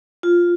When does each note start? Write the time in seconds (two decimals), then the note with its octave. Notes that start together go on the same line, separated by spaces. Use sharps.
0.23 F4